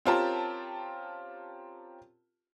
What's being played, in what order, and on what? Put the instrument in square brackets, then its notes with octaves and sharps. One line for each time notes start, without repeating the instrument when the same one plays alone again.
[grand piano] C4 C#4 F4 G4 A#4 A5